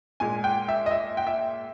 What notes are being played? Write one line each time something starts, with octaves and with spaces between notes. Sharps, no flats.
A#2 G#3 G#5
G5
E5
D#5
E5
G5
E5